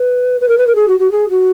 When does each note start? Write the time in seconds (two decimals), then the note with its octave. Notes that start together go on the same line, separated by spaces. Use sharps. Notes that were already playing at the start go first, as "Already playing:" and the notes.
Already playing: B4
0.40 B4
0.48 A#4
0.58 B4
0.67 A#4
0.75 G#4
0.87 F#4
0.99 F#4
1.11 G#4
1.29 F#4